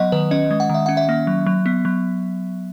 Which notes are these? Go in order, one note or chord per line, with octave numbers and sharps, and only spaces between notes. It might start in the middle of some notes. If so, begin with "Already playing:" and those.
Already playing: F#3 B3 D#5 F#5
D#3 B4
C#4 D#5
G#3
F#5
D#3 E5
C#4 F#5
E5
A#3
F#3
F#3
B3
F#3